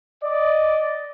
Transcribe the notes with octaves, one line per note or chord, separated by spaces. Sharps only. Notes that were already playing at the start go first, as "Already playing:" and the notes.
D5 D#5